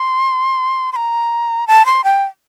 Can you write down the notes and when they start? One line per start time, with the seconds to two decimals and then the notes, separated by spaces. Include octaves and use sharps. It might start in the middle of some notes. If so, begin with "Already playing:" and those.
Already playing: C6
0.92 C6
0.96 A#5
1.67 A5
1.86 C6
2.04 G5